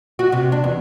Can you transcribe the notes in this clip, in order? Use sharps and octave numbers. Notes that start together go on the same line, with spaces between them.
F#4
C3
D4
E2